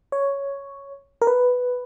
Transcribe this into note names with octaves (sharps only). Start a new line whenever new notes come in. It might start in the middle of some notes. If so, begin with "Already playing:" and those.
C#5
A#4
B4